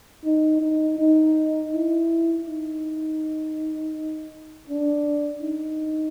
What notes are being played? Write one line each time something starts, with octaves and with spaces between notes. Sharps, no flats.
D#4
D#4
D#4
E4
D#4
D4
D#4